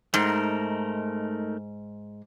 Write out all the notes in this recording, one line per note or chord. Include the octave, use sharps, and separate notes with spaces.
G#2 A3 D#4 A#4